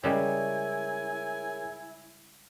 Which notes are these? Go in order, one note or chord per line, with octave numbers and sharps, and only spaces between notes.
C#3 G3 G#3 E4 G#4 A#4 C#5 G#5